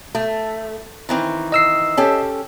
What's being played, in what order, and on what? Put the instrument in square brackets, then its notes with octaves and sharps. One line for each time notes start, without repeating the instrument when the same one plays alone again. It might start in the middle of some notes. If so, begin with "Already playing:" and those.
[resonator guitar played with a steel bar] A3
D#3 E3 C4
[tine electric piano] D#5 E6 C7
[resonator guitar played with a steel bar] C#4 G4 A4